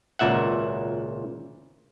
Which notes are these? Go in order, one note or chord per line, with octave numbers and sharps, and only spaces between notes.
G#1 C#2 A#2 E5 F#5